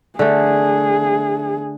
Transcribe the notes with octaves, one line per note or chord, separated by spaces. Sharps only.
D3 A3 G#4